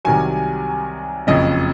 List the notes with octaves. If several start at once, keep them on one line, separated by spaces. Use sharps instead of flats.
C2 C3 D#3 F#3 G#5
F#1 F2 C#3 D#5